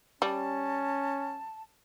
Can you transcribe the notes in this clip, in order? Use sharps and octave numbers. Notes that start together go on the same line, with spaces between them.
G3 C#4 A5